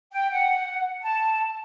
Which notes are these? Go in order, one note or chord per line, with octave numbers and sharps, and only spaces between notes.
G5
F#5
A5